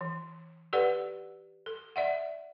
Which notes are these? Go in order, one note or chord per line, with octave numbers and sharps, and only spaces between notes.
E3
G4 A4 B4 D5 F#5
A4
D5 E5 F#5